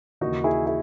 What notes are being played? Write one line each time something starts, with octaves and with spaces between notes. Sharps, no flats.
D#2 C#3 E3 D#4 F#4
E4 G#4
E4 G#4